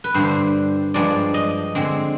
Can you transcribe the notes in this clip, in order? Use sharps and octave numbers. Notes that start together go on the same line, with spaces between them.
B4
G2 D3 G3 C5
G2 F3 G#3 D5
D#5
D3 G#3 C4